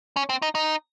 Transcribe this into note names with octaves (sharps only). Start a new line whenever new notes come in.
C#4
C4
D#4
D#4